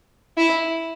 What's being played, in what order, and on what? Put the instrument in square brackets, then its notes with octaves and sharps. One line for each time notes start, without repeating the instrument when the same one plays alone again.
[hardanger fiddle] E4